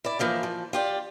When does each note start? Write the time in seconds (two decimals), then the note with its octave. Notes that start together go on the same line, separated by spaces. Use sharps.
0.04 E4 D5
0.19 E3 F3 A#3 D#4
0.43 F3
0.73 F4 G4 D5